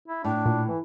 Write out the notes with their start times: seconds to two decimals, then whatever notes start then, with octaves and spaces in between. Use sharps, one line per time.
0.08 E4
0.24 A2 D4
0.46 A#2
0.68 E3